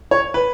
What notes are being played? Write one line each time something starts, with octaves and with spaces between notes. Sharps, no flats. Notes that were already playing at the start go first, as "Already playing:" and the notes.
C#5
B4